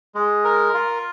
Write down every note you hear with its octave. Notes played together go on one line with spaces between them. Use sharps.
G#3
A#4
F4